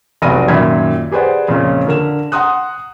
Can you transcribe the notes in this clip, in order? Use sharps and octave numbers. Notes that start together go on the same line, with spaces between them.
F1 B1 D5 A#6 D#7
F#2 A#2 D#3 E5 B5 G#6
G4 G#4 B4 C5 D5 F#5
F2 A#2 C#3 C#4
D3 A#4 E7
F#5 A#5 C6 D#6 F#6